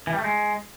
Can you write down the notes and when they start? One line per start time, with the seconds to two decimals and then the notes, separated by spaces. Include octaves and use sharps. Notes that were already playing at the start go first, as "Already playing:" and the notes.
0.07 E3
0.13 G3
0.19 A3
0.24 G#3